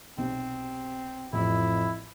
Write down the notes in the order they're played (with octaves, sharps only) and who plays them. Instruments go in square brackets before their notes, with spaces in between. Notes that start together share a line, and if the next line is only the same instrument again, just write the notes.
[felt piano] B1 C3 [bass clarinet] C4
[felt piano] A1 [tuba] F2 [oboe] E4